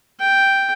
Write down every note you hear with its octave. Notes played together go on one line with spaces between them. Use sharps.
G5